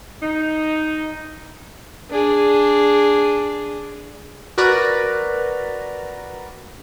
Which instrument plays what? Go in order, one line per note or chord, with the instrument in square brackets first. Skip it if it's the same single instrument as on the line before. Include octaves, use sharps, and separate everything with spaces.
[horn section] D#4
[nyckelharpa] D4 G#4
[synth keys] F#4 A#4 B4 D5 A#5